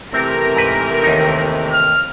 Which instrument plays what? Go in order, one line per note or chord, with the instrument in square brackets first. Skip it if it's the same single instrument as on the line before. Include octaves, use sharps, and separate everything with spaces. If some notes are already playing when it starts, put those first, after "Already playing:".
[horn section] C3 E3 A3 [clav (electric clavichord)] C4 [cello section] A#4
[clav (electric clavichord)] G#2 B4
D#2 D#4
[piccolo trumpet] F6